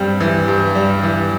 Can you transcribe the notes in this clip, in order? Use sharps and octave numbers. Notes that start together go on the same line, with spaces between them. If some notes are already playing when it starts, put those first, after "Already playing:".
Already playing: G2 G3 C4
E3
G2
G3
E3